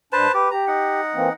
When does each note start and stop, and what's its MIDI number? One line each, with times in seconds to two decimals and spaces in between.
0.13 0.27 43
0.13 0.27 62
0.13 0.32 71
0.13 0.32 72
0.13 0.32 81
0.34 0.49 67
0.34 0.50 71
0.51 1.01 67
0.51 0.65 82
0.67 1.33 63
0.67 1.33 78
1.15 1.29 52
1.15 1.29 58
1.15 1.29 60